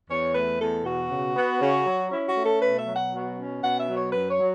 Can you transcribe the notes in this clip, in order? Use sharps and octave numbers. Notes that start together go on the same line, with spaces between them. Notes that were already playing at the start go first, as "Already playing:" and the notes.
E2 C#5
A3 B4
E2 A4
B2 F#4
C#3
B3
C#3
F#3
C#4 E4
F#4
A3
A4
B2 B4
E5
F#3
F#5
B2 F#4
C#4
B2 F#5
E5
F#3
C#5
F#2 B4
C#5
F#3